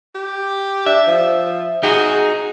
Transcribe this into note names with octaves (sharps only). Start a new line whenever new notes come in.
G4
D4 E5
F3
D#4 F#4 G#4